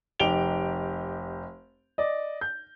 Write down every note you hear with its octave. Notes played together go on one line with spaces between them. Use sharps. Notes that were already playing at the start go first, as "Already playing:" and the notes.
F1 D#4 G4 D7 F7 G7
D5 D#5
G6